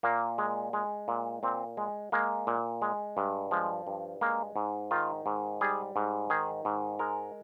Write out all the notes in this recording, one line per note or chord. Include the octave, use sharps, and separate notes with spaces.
A#2 A#3
G#3
G#3
A#2
A#2 C4
G#3
G#3 A#3
A#2
G#3
G2
F3 G#3
G2
G#3 A#3
G#2
D#3 F4
G#2
G3 G#4
G#2
D#3 G#4
G#2
G#3 A#4